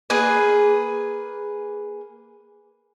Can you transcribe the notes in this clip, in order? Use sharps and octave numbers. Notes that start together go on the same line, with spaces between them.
A#3 G#4 B4